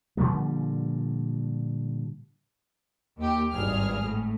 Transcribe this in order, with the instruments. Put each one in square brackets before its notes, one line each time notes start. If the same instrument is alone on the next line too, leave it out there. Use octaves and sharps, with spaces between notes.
[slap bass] A#2 D3 F3 G3
[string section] D#2 G4
G#1 G2 G#4 F6
A2